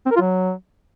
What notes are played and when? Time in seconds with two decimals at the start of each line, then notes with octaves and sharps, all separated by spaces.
0.06 C4
0.11 A#4
0.16 F4
0.21 F#3